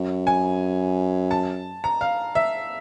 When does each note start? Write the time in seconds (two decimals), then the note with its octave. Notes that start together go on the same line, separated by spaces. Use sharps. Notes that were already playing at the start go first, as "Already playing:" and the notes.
Already playing: F#2
0.27 G#5
1.31 A5
1.84 A#5
2.01 F5
2.35 E5